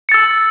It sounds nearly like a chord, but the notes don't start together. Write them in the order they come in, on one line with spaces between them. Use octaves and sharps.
C#7 A6 E6